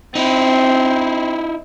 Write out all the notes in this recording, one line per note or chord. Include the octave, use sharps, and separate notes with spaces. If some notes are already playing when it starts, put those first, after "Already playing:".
C4 D#4 E4